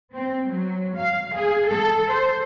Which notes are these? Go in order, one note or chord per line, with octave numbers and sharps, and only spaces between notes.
C4
F#3
F5
G#4
A4
C5